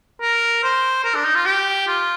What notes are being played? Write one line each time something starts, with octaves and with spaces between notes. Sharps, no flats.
A#4
C5
A#4
D4
D#4
F4
G4
F4